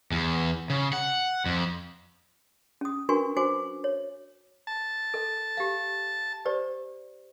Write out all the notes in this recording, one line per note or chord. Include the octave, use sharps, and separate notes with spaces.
E2
C#3
F#5
F2
C#4 D#6
D4 F#4 A#4 B4 G#5 C#6
F#4 C5 G#5 D6
C#5
A5
A4 D#5
G4 F5
G4 C5 D5